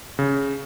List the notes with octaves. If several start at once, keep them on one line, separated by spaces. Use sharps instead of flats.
C#3